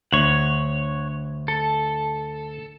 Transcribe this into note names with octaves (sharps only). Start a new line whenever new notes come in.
D2 C#5 F#5
A4